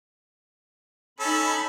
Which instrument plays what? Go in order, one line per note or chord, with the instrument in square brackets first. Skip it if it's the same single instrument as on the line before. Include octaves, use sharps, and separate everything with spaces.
[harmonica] C#4 A4 [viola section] D#4 B5